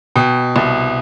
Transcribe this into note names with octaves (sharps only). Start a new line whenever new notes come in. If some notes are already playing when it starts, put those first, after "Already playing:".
B2 G5
C2